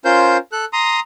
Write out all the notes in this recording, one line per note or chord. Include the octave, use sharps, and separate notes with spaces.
C#4 F4 A#4 C5 C6 G6
A4 F#6
A#5 C6 D#6